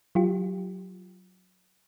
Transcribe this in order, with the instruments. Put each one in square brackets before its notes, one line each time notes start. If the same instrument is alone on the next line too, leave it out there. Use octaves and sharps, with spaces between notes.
[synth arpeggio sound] F#3 F4 G4